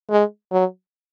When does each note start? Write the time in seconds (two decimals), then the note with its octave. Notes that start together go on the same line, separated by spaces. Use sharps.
0.10 G#3
0.52 F#3